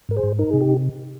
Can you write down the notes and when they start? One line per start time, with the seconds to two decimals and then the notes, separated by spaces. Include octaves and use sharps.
0.09 G#2 A#4
0.16 G#4 C5
0.23 G#2
0.39 D#4 A#4
0.51 C3 G#4
0.61 G4